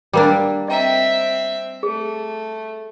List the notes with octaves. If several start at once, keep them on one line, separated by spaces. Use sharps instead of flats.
G3 A#3 D4 A#4 D6
C4 D#5 E5 G5 A#5
A3 G#4